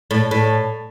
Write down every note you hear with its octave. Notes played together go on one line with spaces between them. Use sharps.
A2
A2